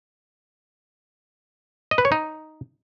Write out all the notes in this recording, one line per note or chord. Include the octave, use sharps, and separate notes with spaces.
D#5
B4
C#5
D#4